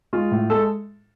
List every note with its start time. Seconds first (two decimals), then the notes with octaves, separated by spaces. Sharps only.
0.13 G#3 F4
0.31 A2
0.50 G#3 A4